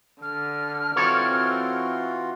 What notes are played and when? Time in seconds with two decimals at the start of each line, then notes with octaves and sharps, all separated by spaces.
0.22 D3 F6
0.96 E3 C4 F4 F#4 A4 C#5